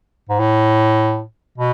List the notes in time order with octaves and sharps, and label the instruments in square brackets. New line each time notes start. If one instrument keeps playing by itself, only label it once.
[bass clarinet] G#2
A2
B2